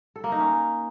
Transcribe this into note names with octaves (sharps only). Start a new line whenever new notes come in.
A4
A#3
D#4
C#4